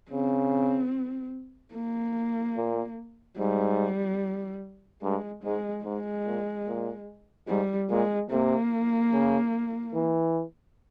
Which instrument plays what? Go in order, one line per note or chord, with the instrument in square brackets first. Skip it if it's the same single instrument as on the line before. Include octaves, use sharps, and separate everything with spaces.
[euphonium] C#3 [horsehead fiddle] C4
[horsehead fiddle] A#3
[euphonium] A#2
[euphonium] G#2 [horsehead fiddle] G3
[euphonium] G2 [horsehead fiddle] G#3
[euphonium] G#2 [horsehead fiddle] G#3
[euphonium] G#2 [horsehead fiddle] G#3
[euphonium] A#2
A#2
[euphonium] G#2 [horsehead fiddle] G3
[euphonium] A#2 [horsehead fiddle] G#3
[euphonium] C3 [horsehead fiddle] A#3
[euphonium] C#3
E3